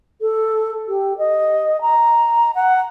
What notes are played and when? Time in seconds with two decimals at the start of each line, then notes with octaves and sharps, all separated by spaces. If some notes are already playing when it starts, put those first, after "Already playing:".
0.21 A4
0.88 G4
1.18 D#5
1.81 A#5
2.55 F#5